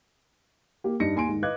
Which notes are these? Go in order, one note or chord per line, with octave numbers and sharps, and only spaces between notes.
A#3 G4
G2 D#4 A#6 C#7
D#2 G#5 C6 D7
G#2 D#3
B4 D#5 F5 D6 F#6 G#6